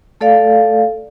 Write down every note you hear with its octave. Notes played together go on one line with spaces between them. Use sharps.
A3 A4 D5 F5